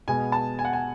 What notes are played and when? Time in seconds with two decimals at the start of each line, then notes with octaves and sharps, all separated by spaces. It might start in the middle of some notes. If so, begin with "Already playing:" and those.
0.08 B2 G#3 B3 G#5
0.32 A5
0.59 G#5
0.65 F#5
0.73 G#5